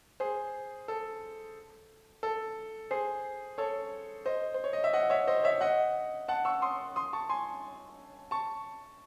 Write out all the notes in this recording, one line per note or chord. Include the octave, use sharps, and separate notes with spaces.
G#4 C5
A4
A4
G#4 C5
A4 C#5
C5 D#5
C5
C#5
D#5
E5
D#5 F#5
C#5 E5
C5 D#5
C#5 E5
D#5 F#5
F#5 A5
C#6 E6
C6 D#6
C6 D#6
A5 C#6
G#5 C6
A5 C#6